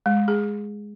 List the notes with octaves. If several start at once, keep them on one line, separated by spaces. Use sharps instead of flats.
G#3
G#4